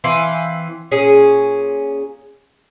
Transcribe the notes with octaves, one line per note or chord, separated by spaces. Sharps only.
E3 C4 F5 G#5
A#2 C#4 G#4